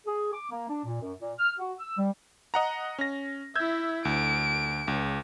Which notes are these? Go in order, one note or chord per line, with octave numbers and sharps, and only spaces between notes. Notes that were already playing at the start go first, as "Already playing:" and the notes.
G#4
D6
A#3
D4
A#2
F#2
A#2
F6
F#4
E6
G3
D#5 F#5 A#5
C#4 A#6
E4 E5 E6 G6 G#6
D2 D7
C#2